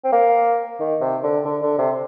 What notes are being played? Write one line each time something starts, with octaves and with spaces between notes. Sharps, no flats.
C4
A#3
D#3
C3
D3
D3
D3
C3